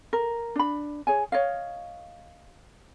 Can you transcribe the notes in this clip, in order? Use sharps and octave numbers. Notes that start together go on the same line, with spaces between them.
A#4
D4 B5
G#4 C#5 G#5
C#5 D#5 F5